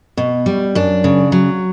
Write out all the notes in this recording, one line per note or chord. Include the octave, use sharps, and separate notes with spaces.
B2
G3
F#2 D4
C#3
F#3